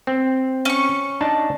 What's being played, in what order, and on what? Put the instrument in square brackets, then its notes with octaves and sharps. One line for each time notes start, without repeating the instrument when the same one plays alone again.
[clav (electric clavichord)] C4
[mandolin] C#4 C#6
[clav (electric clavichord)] D4 D#4 A5